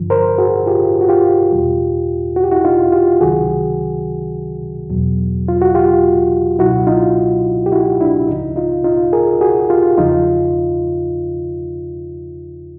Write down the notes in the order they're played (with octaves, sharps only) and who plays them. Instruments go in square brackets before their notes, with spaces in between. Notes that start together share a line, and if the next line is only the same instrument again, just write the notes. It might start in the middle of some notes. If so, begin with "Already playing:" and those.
Already playing: [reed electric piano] G2 D3 F3
A#4 C5
F#4 G#4
F4 G4
F#4
F4 G4
E2 B2 G3
F#4
G4
E4 F#4
D#4 F4
F4 G4
C#2 C3 D#3 F#3 F#4 G#4
E2 B2 F#3
F4
F#4
F4 G4
C#2 B2 F#3 E4 F#4
D#4 F4
G4
E4 F#4
D4 E4
C#2 C#3 F3 D#4
D#4 F4
D#4 F4
G#4 A#4
F#4 G#4
F4 G4
E2 C#3 F3 D#4 F4